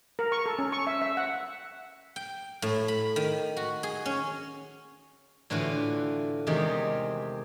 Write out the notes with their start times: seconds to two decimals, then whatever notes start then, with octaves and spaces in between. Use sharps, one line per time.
0.19 A#4
0.32 C#6
0.46 A4
0.59 C#4
0.72 C#6
0.87 E5
1.02 E5
1.17 F#5
2.16 G5
2.62 A2
2.88 B5
3.16 D#3
3.57 F#4
3.83 G#4
4.06 C#4
5.50 A2 D3 E3 F4 F#4
6.47 E2 C3 D#3 G#3 G4 D5